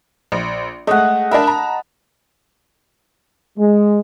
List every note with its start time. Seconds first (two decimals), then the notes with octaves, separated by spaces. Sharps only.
0.32 A#1
0.87 G#3 A3 D#5 F#5
1.31 D4 A#4 E5 A5 B5
1.47 A#5
3.58 G#3